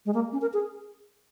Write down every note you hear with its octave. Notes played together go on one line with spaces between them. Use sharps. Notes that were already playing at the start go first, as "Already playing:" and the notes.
G#3
A#3
C#4
A#4
G#4